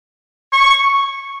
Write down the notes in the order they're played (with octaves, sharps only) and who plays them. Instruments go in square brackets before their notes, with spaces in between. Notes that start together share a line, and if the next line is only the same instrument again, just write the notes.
[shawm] C#6